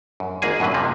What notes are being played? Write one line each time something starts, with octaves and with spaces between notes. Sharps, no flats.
F#2
G#1 G#2 A#3 G#4 G#5
F#2 A2 D3 F#3 B4
F2 G#2 C3 F3 A#3